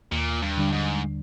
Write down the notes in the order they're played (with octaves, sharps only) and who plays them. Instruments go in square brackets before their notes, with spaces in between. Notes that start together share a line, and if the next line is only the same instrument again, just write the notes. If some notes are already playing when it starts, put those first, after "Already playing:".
[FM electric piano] D#2 [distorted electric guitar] A#2
[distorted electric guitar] G2
[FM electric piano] D3 G3 D4
[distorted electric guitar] G#2